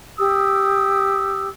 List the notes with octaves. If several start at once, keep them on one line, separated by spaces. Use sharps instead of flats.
G4 D#6 E6